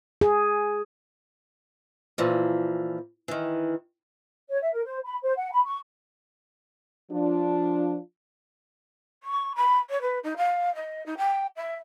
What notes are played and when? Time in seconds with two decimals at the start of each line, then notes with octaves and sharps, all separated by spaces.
0.21 G#4
2.18 A#2 E3 F3
3.28 D#3 E3
4.50 C#5
4.61 E5
4.73 A#4
4.85 C5
5.04 B5
5.22 C5
5.37 F#5
5.51 B5
5.65 C#6
7.11 F3 D4 F4
9.22 C#6
9.56 B5
9.90 C#5
10.01 B4
10.23 D#4
10.37 F5
10.75 D#5
11.06 D#4
11.18 G5
11.56 E5